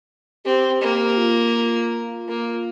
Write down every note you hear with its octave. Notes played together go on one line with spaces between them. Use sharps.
C4 G4
A#3
F4
A#3